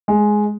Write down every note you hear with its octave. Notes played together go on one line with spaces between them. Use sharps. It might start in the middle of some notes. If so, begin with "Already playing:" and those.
G#3